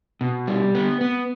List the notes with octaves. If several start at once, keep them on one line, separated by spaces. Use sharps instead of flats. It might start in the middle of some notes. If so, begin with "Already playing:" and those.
B2
G3
B3
B3